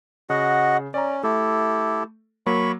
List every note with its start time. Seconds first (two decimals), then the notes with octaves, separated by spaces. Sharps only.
0.30 C#3 F#4 D#5 F#5
0.94 C#4 D5 A#5
1.23 A3 E4 G4 A4
2.46 F#3 A#3 B5 C#6